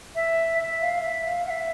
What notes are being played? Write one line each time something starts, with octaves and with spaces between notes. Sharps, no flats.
E5
E5
F5
E5
F5
F#5
E5